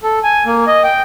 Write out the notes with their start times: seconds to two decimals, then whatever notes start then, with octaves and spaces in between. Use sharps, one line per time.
0.03 A4
0.24 G#5
0.46 A#3
0.67 D#5
0.84 G5